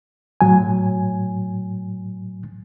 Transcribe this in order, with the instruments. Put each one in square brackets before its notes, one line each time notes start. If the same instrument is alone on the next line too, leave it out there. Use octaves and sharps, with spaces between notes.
[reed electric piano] A2 F#3 G#5